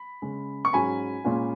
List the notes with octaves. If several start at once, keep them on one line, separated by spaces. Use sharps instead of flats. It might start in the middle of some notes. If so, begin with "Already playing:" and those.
Already playing: B5
C#3 G#3 C#4
C#6
G#2 F#3 C#4 G#5 B5
A#2 G#3 C#4 F4